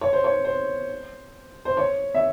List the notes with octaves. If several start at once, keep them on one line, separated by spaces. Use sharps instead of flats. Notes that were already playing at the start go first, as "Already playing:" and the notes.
C#5
C5
C#5
C5
C5
C#5
E5